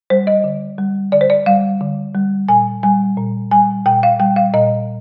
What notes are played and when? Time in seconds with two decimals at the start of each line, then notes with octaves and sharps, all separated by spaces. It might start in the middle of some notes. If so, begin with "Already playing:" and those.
0.10 G3 C5
0.27 D#5
0.44 D3
0.78 G3
1.12 D3 D5
1.21 C5
1.30 D5
1.46 G3 F5
1.81 D3
2.15 G3
2.49 A#2 G#5
2.83 G3 G#5
3.17 A#2
3.51 G3 G#5
3.86 A#2 G5
4.03 F5
4.20 G3 G5
4.36 F5
4.54 A#2 D#5